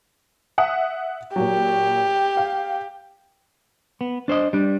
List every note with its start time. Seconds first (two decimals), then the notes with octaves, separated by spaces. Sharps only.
0.58 E5 F#5 D#6
1.36 A#2 F#3 G4
2.37 F5
4.01 B3
4.28 D4 C5 C#5 D#5
4.53 G3 D4